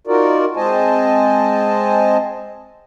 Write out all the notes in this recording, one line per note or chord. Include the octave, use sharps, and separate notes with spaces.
D#4 F4 F#4 A#4 D5
G#3 C4 C5 D#5 G#5 A5